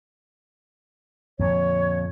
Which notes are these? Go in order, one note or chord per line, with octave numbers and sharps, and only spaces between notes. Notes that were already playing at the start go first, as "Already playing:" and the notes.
F2 A#2 D3 C#5